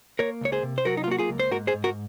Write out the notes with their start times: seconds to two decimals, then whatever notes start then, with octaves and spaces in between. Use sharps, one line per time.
0.19 A#3 A#4 C#5
0.41 C#2 C#5
0.52 G#4 C5
0.63 C3
0.78 C5
0.85 F#3 F#4 A#4
0.97 D#4
1.04 F4
1.07 A#3 F#4
1.18 F4 G#4
1.29 C#2
1.40 C5
1.51 G#2 F#4 A#4
1.67 G#4 C5
1.74 G#2
1.84 F#4 A#4